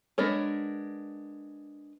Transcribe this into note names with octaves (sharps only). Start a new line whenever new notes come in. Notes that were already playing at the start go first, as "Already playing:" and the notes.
G#3 B3 D4 A#4 C#5